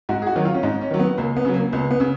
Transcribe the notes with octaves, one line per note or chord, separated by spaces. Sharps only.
G#2 F#4
G#4
F#4
D#3 F#3
F4
C#4
G#2 D#4
C#4
D#3 F#3
B3
C#2 A#3
B3
C#3 F#3
A#3
C#2 B3
B3
C#3